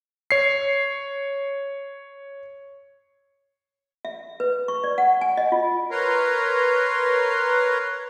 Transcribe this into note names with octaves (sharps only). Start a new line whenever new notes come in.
C#5 C7
E5
B4
C#6
D5
F#5
G#5
D#5
F4
A#4 B4 C#5 A#5 C6